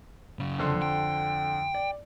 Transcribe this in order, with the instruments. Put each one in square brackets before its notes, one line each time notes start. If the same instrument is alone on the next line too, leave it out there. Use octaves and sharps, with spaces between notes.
[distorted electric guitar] F#2 C#3
[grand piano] F2 D3 C6
[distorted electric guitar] G5
[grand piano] D5